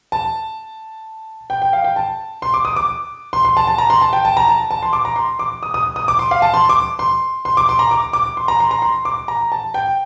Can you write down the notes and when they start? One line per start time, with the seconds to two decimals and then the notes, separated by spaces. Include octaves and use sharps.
0.12 A5
1.50 G5
1.62 G5
1.73 F5
1.84 G5
1.96 A5
2.42 C6
2.54 D6
2.65 D#6
2.76 D6
3.33 C6
3.45 C6
3.57 A5
3.67 A5
3.78 A#5
3.90 C6
4.01 A5
4.13 G5
4.25 A5
4.37 A#5
4.48 A5
4.71 A5
4.83 C6
4.93 D6
5.05 A#5
5.16 C6
5.39 D6
5.63 D#6
5.74 D#6
5.96 D#6
6.08 D6
6.19 C6
6.31 F5
6.42 A5
6.54 C6
6.69 D6
6.99 C6
7.45 C6
7.57 D6
7.69 C6
7.79 A#5
7.91 D6
8.13 D6
8.37 C6
8.48 A#5
8.60 C6
8.71 A#5
8.82 C6
9.05 D6
9.28 A#5
9.52 A5
9.74 G5